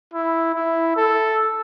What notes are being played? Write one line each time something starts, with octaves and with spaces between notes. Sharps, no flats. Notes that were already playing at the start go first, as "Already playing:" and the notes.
E4
E4
A4